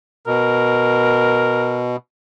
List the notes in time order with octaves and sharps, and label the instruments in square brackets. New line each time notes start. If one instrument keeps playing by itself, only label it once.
[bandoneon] B2 [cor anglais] A#4